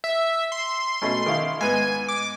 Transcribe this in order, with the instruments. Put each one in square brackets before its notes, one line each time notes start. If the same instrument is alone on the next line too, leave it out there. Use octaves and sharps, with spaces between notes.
[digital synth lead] E5
C6
[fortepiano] B2 A3 C#4
D#3 E4 F5
[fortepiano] G#2 B3 [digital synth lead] G#5
[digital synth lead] D6